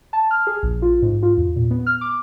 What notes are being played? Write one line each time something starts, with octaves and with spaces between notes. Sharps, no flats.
A5
F6
G#4
A#1
F4
G#2
F4
E2
A#2
B3
F6
D6